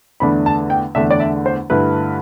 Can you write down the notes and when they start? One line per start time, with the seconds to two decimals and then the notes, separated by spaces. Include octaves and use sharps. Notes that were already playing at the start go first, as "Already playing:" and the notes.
0.20 E2 D3 A3 D4 B5
0.46 A5
0.70 G5
0.95 E2 D3 A3 D4 E5
1.11 D5
1.20 E5
1.46 C5
1.70 G2 D3 A3 E4 B4